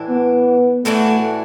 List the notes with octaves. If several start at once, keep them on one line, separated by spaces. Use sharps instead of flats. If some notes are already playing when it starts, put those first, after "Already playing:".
Already playing: A2 E3 D4
B3
A2 E3 A3 D4 F#4